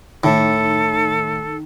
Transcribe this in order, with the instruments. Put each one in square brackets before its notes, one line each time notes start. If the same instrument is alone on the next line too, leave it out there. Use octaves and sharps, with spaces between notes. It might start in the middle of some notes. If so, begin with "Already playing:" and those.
[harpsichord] A2 [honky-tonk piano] D#3 [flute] A4